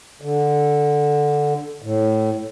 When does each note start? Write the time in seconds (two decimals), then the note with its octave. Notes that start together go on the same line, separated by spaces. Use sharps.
0.22 D3
1.82 A2